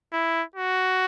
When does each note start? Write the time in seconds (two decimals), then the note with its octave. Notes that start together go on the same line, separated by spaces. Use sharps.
0.13 E4
0.56 F#4